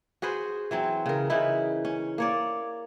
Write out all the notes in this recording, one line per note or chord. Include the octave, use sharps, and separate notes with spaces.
F#4 G#4 B4 C5
E3 F#3 C4
C#3 A#4
C#3 E3 D#4 E4
C#4
A#3 C#5 D5